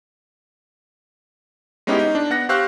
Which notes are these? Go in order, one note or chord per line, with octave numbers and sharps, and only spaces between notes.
G#3 B3 C#4 D#4 E4 G4
D#4
D4
B3 F#5 F#6 A#6
G4 C5 F5 C#6 E6 F#6